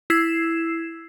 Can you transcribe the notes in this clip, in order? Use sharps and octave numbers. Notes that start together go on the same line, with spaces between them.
E4 E6 G#6 C7 E7